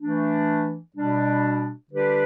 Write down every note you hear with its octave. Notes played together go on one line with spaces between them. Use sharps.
E3 A3 D4
B2 G3 D4
D3 G3 D4 G4 B4